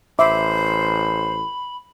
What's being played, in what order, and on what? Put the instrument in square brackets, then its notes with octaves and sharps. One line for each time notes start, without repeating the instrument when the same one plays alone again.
[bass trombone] A1 [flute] C5 [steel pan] E5 D6 [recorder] B5